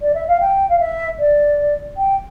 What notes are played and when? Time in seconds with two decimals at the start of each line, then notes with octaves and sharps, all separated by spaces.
0.01 D5
0.14 E5
0.28 F5
0.40 G5
0.69 F5
0.79 E5
1.19 D5
1.97 G5